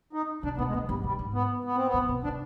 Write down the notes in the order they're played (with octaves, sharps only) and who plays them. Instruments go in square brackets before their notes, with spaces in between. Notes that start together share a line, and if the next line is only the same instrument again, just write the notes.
[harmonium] D#4
[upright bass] C3 [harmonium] D4
[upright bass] B2 [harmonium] B3
[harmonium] G#3
[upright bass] B2 [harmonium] B3
[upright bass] G2 [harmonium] G3
[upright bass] B2 [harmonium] G3
[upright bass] G#2
[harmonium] B3
B3
C4
B3
[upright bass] G2
B2
[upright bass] C3 [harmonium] D4